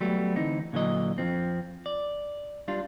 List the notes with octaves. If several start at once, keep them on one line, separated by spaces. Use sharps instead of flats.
F#3 G3 A3 B3
D2 E3 C4 D#4
A#2 D3 E3 F#3 D#5
F2 F3 C4
D5
G3 D4 F4